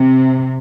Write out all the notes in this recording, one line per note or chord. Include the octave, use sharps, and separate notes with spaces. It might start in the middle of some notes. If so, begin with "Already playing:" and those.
Already playing: C3